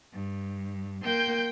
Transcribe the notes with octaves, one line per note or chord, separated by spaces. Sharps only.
G2
A#3 G5 C6 G6